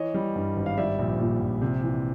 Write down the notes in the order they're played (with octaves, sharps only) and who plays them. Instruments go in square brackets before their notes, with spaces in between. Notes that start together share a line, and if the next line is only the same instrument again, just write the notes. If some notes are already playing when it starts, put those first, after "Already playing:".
Already playing: [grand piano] E3 C#5 D#5
G3
G2
G#1
F5
G3 D5 E5
A#1
A#2
A#1
C3
E3